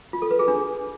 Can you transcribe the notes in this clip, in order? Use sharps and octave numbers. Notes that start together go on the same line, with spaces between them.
F4
A4
B4
G#4
D4